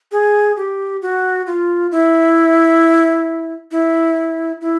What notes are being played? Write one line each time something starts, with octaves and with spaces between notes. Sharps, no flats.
G#4
G4
F#4
F4
E4
E4
E4